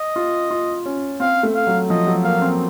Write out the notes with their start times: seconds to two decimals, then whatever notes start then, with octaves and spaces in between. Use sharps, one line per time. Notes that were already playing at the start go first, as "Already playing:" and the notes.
Already playing: D#5
0.16 F4
0.51 F4
0.86 C#4
1.20 C4 F5
1.43 A3
1.55 F5
1.67 F#3
1.90 F3 D#5
2.07 F#3
2.24 A#3 F5
2.42 C4